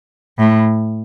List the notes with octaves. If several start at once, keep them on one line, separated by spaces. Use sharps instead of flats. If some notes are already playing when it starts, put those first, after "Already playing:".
A2